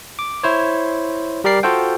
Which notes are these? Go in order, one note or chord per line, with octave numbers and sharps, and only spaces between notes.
D6
E4 C5 C#5
G3 G4 A#4 D5 C7
F4 F#4 A4 C5 F5 G5